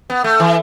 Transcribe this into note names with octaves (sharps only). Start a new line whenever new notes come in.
B3
A3
E3